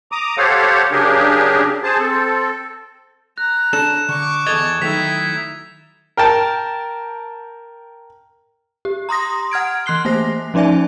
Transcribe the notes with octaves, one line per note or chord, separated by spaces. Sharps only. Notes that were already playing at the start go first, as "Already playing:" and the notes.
A#5 D6 D#6
G4 A4 C5 C#5 F5 F#5
C#3 F#3 D4 G4 G#4 A#4
G#4 C5 A5
C4 A4
A#5 F#6
D4 A4 C#5 E7
D3 C#6 D6
E2 A4 D#5 G#6 A6 F7 G7
D#3 F#3 A3 D#4 E4 B6 F7
A#4 G5 A5
G4
A#5 C6 D#6 A#6
F#5 F6 G#6 D7
E3 C6 F#6 C7 G7
A3 A#3 C5 A#6
F3 C#4 D#4 D5 E5 G#5